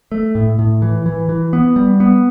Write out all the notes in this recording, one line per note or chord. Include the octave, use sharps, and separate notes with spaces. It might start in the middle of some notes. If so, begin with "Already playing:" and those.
A3
A2
A2
E3
E3
E3
B3
G3
B3